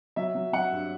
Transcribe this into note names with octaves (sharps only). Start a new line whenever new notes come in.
F#3 E5
F#3
F#3 F#5
G2